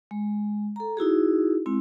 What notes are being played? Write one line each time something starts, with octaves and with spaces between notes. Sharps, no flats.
G#3
A4 A#5
D#4 E4 F#4 G#4
G#3 C4 E4